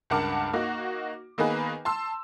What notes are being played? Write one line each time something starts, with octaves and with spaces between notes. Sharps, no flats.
C#2 G2 A#4 F#5 A5 D6
A#3 D#4 F#4
D#3 A#3 B3 D#4 G#4 B4
A5 C6 E6